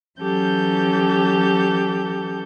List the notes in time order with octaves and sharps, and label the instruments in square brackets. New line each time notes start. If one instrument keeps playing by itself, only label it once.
[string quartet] E3 F#3 C#4 G4 A4 G6